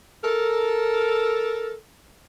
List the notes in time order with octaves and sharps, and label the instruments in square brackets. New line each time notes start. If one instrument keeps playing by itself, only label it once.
[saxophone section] A4 A#4